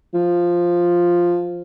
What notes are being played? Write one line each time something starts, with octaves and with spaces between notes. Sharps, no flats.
F3